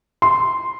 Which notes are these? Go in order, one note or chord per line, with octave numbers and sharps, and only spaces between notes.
C6